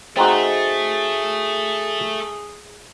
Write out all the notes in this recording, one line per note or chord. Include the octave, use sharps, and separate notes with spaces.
A3 C4 D#4 F#4 G#4